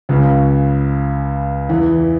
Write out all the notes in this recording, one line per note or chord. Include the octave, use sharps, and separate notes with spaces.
C#2 C#3
E2 E3